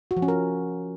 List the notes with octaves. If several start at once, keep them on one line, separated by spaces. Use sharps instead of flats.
F#4
F3
C#4
A#4